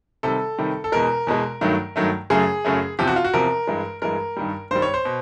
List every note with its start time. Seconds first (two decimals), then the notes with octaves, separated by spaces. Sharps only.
0.23 C3 D#3 G3 A4
0.58 C3 D#3 G3
0.84 A4
0.92 E2 B2 G#3 A#4
1.27 E2 B2 G#3
1.61 G2 D#3 F#3 A3
1.96 G2 D#3 F#3 A3
2.30 F#2 C#3 F#3 A3 G#4
2.64 F#2 C#3 F#3 A3
2.99 E2 C3 F3 G4
3.07 F#4
3.16 F4
3.24 F#4
3.34 E2 C3 F3 A#4
3.67 G2 E3 G#3
4.02 G2 E3 G#3 A#4
4.37 G2 D#3 G3
4.71 G2 D#3 G3 C5
4.82 C#5
4.94 C5
5.05 B2